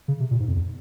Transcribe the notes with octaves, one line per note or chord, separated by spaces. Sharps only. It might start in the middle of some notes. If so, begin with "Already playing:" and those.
C#3
C3
A#2
G#2
F2
E2